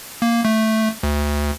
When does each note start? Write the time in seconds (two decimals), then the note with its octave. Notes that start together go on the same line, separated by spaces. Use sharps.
0.22 A#3
0.45 A3
1.03 D2